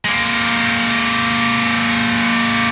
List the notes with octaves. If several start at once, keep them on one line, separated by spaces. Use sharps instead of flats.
G#3 A#3